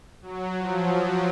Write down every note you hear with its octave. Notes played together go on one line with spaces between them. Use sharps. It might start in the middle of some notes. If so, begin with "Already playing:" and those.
F#3
F3
F#3